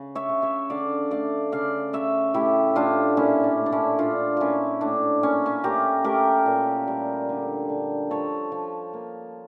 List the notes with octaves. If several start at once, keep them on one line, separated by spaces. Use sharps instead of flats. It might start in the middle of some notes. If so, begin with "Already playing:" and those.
Already playing: C#3
C#5 E5
C#3
C#5 E5
D3 D5 F5
A3 D5 F5
C#3 D5 F5
C#3 C#5 E5
A2 E4 G4
A2 D4 F4
A#2 C#4 E4
D4
A3
D4
C#4 E4
A#2 D4 F4
A#2 C#4 E4 F4
A2 D4
A#3 C#4
C#4
A3 G4 A#4
A3 G4 A#4
A#2
G3
D3
D3
F3 A4 C#5
F3
A#3